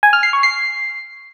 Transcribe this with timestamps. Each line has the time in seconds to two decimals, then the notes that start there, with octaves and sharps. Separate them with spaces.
0.03 G#5
0.13 F6
0.23 C7
0.33 C#6
0.43 C7